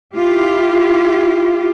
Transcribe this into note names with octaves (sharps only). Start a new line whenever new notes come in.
E4 F4 G4